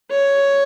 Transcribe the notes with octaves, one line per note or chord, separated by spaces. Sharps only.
C#5